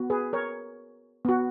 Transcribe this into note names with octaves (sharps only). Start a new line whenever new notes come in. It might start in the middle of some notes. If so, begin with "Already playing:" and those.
Already playing: B3 F#4
G#4 B4
A#4 C#5
B3 F#4